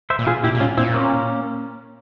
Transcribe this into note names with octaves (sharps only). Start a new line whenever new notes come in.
C5 E5
A#2
F4 G#4
A#2 E4 G4
A#2
G#2 C#4 F4
A#2 C4 E4
A#3 C#4